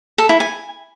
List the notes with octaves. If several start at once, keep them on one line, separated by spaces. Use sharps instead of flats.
A4
E4
G#5